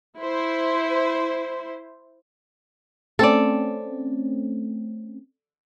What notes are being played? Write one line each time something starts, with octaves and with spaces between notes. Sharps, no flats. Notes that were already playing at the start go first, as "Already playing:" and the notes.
E4 C5
A3 C4 C#4 A4 D5